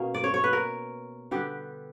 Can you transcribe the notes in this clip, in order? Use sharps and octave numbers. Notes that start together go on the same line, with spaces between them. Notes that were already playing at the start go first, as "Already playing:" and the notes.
Already playing: B2 A#3 C#4
D5
C#5
C#5
B4
A#4
D3 G3 B3 G4